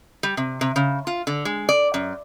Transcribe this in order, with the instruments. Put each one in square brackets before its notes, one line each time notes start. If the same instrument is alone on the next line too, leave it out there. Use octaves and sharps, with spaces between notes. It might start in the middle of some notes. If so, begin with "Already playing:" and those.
[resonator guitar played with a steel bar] G3
C3
C3
C#3
F4
D3
G#3
D5
F#2